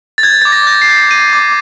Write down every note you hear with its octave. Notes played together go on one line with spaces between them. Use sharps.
A6
G6 G#6
D6 A6
A#6
G6
C7
G6
G6 D#7
D6